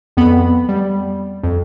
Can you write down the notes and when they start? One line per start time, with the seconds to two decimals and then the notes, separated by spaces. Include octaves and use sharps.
0.17 F2 B3 B5
0.69 G3
1.43 F2